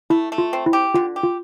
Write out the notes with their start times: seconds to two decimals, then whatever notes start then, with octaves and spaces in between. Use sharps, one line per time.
0.10 A3 E4
0.32 A3
0.38 F4
0.53 C4
0.66 E4
0.73 G4
0.94 D3 F4
1.16 G4
1.23 F4